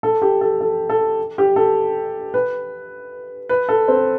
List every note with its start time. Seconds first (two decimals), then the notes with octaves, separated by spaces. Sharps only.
0.03 A4
0.22 G4
0.41 A4
0.61 A4
0.90 A4
1.38 G4
1.56 A4
2.34 B4
3.49 B4
3.69 A4
3.88 C4